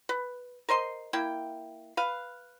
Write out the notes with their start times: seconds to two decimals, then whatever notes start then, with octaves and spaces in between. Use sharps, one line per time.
0.09 B4
0.69 A#4 C5 D#5 C6
1.13 A#3 E4 G5
1.97 B4 F5